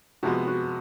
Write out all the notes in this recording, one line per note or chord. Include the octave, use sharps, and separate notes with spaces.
C3 F3 G#3 B3 F#4
F#4